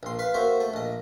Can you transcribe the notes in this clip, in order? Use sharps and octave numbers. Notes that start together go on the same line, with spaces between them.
A#1 C6
B4 F5 B5
A#3 F#4 C5 E5
A3
A#1 D#5